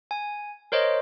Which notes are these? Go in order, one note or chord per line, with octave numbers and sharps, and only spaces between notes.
G#5
A#4 C5 C#5 D#5